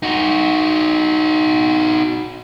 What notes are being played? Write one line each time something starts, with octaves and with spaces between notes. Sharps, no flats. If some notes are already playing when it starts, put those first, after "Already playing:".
D#4 F#4